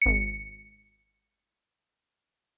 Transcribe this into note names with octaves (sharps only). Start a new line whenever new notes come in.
G#1 C#7